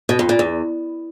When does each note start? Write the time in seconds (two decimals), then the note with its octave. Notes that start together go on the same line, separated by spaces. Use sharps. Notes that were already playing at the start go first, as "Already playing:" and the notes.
0.09 B2
0.19 F2
0.29 A#2
0.39 E2